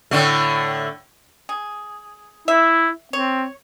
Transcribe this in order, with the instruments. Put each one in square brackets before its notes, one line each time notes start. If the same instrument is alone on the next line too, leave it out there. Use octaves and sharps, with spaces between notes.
[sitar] A2 D3 A3
[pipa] G#4
[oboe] E4 [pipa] E5
[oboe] C4 [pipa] C#5